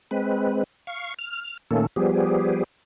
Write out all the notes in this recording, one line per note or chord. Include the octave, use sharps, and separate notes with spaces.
G#3 C4 B4
F5 C#6
F6
A#2 D#3 A3 A#3 C#4 A4
F3 G3 B3 G4 G#4